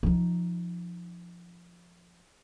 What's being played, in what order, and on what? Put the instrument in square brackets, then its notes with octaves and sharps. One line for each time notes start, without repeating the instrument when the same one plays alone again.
[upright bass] F3 D#4